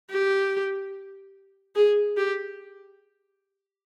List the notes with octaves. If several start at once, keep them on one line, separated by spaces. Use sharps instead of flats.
G4
G#4
G4